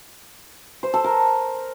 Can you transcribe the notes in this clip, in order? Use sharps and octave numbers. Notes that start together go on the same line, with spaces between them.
C5
A4
A#4